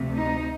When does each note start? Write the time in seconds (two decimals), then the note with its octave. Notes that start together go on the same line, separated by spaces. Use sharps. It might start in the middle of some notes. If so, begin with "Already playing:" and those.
Already playing: D2 C3 F3 A3
0.13 D#4